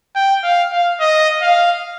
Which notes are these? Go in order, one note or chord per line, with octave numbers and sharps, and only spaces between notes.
G5
F5
F5
D#5
F5